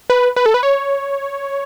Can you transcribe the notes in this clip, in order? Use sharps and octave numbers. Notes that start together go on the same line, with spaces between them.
B4
B4
A4
B4
C#5